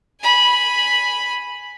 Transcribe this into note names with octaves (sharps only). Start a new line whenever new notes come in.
G#5 B5